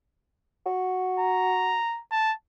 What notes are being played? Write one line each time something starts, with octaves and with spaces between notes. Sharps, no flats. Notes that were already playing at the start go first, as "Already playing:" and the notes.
F#4
A#5
A5